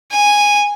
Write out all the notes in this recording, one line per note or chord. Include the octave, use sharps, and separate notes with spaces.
G#5